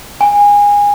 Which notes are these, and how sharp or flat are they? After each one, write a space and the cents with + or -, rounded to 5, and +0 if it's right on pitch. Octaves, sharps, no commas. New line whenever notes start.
G#5 -20